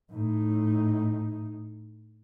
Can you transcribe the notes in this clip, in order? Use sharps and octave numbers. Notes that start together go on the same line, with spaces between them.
A2 D#4